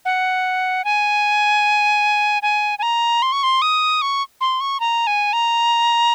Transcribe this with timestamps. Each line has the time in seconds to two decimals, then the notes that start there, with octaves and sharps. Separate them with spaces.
0.05 F#5
0.85 G#5
2.42 G#5
2.79 G#5
2.83 A#5
3.22 C6
3.32 C#6
3.43 C6
3.62 D#6
4.02 C#6
4.41 C6
4.61 C#6
4.80 A#5
5.07 G#5
5.33 A#5